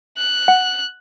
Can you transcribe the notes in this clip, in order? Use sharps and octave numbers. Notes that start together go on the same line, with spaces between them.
F#6
F#5